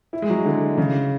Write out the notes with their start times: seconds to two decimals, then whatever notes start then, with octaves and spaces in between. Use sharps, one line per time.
0.13 E4
0.22 G#3
0.30 F#3
0.45 D3
0.78 C#3